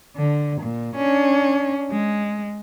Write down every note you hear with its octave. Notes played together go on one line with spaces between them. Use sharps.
D3
A#2
C#4 D4
G#3